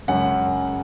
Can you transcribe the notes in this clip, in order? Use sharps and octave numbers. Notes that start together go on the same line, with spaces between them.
F#2 C#3 G#3 C#4 F#5